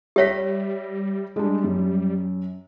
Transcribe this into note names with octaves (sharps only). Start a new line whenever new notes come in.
G3 G4 C#5 E5 A#6 B6
G3 G#3 D4
F#2